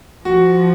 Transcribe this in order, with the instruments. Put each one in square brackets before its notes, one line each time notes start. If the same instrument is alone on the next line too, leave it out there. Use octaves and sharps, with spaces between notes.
[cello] F3 [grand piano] F#4